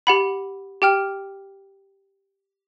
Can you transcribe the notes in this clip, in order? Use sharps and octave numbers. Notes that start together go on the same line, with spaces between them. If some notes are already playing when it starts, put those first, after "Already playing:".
G4 F#5 B5
G4 G5 F6